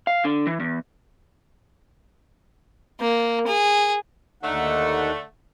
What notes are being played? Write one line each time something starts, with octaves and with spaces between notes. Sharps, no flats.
F5
D3
E3
E2
A#3
G#4
D#2 D3 A3 D#4 F#5